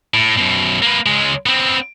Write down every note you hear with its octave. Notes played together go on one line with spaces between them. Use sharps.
A2
F#2 B2
A#3 B4
C#2 G#3
B3 C4